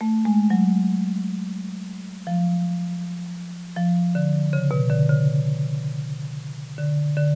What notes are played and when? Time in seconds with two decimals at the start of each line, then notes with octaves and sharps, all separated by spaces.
0.01 A3
0.25 G#3
0.50 F#3
2.27 F3
3.77 F3
4.15 D3
4.53 C#3
4.71 B2
4.90 D3
5.09 C#3
6.78 D3
7.17 D3